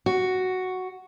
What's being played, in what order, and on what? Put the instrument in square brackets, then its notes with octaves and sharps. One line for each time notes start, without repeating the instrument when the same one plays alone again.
[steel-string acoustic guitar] F#4